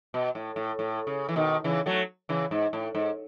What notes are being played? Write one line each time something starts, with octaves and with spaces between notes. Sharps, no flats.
B2
A2
A2
A2
C#3
E3
B2 D#3
C#3 E3
F#3 A3
C#3 E3
G#2
A2
G#2